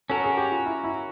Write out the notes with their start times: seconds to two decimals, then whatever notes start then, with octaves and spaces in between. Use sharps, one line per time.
0.10 C#4 F#4 A4 A#4
0.24 G#4
0.37 G4
0.52 F4
0.66 E4
0.84 E4